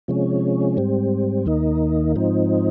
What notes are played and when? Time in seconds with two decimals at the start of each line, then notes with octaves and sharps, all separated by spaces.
0.08 C3 F3 G#3 C#4
0.77 G#2 G3 C4
1.46 D#2 D#3 A#3 D#4
2.16 G#2 F3 C4 D#4